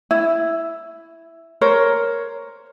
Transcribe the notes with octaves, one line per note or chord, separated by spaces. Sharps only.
E4
A#4 C5 C#5